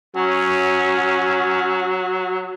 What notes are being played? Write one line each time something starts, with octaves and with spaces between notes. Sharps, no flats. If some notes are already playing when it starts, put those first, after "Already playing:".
F#3 C#4